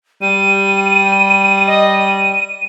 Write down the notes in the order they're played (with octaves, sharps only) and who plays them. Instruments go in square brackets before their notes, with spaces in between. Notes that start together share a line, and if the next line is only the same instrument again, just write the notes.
[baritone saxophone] G3 [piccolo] D#7
[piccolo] D#5
D#7